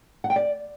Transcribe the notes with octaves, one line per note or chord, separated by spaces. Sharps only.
F#5
G5
D5